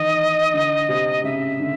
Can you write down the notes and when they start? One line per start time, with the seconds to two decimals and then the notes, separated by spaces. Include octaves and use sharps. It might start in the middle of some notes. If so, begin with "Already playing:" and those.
Already playing: D#3 E3 D#5
0.54 D3
0.89 C3
1.24 C#3 E5
1.60 D3